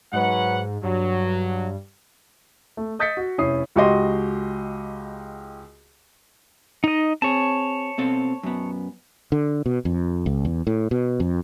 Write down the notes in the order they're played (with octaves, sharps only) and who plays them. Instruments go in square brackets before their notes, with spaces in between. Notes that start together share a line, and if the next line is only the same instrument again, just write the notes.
[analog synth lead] G#2 [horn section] F#3 B4 F#5
[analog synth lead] G2 [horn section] F#3
[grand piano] A3
D#5 D#6 G6 A6 B6 C#7
F#4
F1 C#4 E4 C#5 D#6 C7
[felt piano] C#2 F#4 G4 D#5 C6
[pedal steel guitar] D#4 D#5
[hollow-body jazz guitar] C4 G#4 [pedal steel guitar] C#5 A5
[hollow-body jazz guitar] B2 C4 A4
F#2 B3
[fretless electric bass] D3
B2
F2
C#2
E2
A2
B2
F2